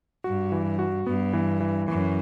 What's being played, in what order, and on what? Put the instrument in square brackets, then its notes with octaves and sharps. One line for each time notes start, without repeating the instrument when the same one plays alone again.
[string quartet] G2 [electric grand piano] F#4
[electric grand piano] E3
F#4
[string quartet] G2 [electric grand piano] B3
[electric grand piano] E3
E3
[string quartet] F#2 [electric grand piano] E3